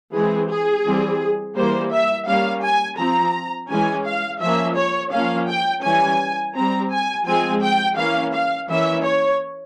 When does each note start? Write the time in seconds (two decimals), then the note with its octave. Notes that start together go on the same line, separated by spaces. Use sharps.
0.13 E3 G#3 C4 G#4
0.49 G#4
0.85 E3 G3 C4
1.56 E3 G3 A#3 C5
1.92 E5
2.27 G3 A#3 C#4 F5
2.63 G#5
2.98 F3 C4 A#5
3.69 E3 G#3 C#4 G#5
4.05 F5
4.41 F3 A#3 C#4 E5
4.77 C#5
5.12 F3 A#3 C#4 F5
5.48 G5
5.83 E3 G3 C#4 G#5
6.55 G3 C4 A#5
6.91 G#5
7.26 F3 G#3 C4 G#5
7.61 G5
7.97 E3 A#3 C#4 F5
8.33 F5
8.69 E3 A#3 C#4 E5
9.04 C#5